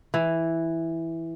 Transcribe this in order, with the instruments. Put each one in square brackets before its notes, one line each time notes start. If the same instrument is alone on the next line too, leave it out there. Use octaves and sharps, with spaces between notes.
[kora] E3